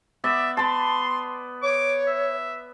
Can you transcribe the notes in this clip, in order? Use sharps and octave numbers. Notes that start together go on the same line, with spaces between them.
B3 D5 E5
B3 A5 C6
C#5 D6
E5